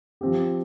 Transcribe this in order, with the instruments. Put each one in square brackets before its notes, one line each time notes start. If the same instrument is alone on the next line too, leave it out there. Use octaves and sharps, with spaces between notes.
[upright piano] F3 C4 G4